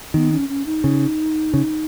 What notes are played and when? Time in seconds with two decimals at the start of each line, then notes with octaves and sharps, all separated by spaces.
0.14 D#3 B3
0.32 C#4
0.49 C#4
0.66 D#4
0.84 C#3
1.54 C#3